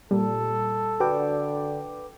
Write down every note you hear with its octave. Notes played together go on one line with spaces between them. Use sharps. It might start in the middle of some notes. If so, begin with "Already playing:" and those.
A#2 G3 A4
D3 F#4 B4 D5 G5 D6